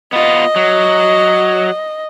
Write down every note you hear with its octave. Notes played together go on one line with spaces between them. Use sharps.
B3 F4 D#5
F#3